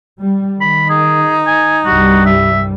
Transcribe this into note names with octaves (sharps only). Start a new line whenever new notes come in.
G3
D#3 B5
D#4 G#4
G#5
C2 G2 G3 F#4
E5